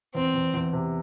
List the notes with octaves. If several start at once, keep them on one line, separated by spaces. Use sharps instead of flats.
E2 C4
E2
E2
C3